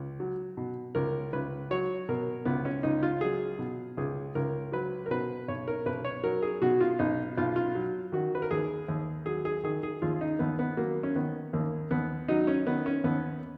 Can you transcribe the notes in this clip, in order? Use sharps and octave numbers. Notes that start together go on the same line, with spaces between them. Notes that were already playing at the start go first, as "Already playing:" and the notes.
Already playing: C#2
F#3
B2
C#2 A#4
C#2 B4
F#3 C#5
B2 A#4
C#2 B3
C#4
C#2 D#4
F4
F#3 G#4
B2
C#2 G#4
C#2 A#4
F#3 B4
A#4
B2 B4
B1 C#5
A#4
B1 B4
C#5
F#3 A#4
G#4
B2 F#4
F4
B1 D#4
B1 F4
F4
F#3
D#3 F#4
B4
A#4
D#2 G#4
D#2
F#3 G#4
G#4
D#3 G#4
G#4
D#2 F4
D#4
D#2 B3
B3
F#3 A#3
C#4
D#3 B3
D#2 A#3
D#2 B3
F#3 D#4
C#4
D#3 B3
C#4
D#2 B3